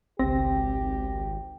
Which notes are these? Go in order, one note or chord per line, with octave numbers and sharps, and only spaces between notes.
G#1 C#2 C4 G4 A#6